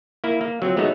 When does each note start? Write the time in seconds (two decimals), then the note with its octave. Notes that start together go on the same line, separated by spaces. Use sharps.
0.24 A#3 E4
0.41 A#3
0.62 F#3 C4 F4 C5
0.77 G#3 A3 B3 D#4 F#4 C#5